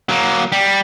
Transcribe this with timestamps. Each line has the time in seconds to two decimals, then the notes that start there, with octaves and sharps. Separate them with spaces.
0.09 F#3 A#3
0.52 G3